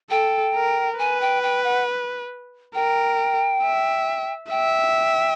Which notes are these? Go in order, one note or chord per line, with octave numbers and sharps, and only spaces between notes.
A4 G5
A#4
B4 G#5
G5
G5
F#5
A#4 G5
E5
E5 G5